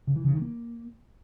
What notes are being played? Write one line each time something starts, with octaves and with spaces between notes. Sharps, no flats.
C#3
E3
C#3
D#3
A#3